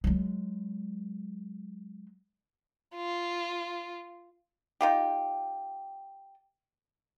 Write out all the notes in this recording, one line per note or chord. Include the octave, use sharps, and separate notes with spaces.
F#3 G#3
F4
D#4 F4 G4